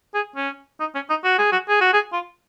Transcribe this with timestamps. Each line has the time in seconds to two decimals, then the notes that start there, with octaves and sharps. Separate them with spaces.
0.14 G#4
0.36 C#4
0.80 D#4
0.95 C#4
1.10 D#4
1.24 F#4
1.39 G#4
1.52 F#4
1.69 G#4
1.81 F#4
1.93 G#4
2.13 F4